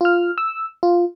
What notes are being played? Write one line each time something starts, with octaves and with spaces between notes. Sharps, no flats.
F4 F6
E6
F4